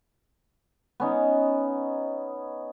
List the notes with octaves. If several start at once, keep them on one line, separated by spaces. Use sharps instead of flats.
B3 C#4 D#4